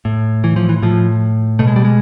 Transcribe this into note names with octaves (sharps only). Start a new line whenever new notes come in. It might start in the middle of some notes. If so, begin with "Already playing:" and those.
A2
E3
F3
E3
A2 F3
B2 A3
G#3
G3
G#3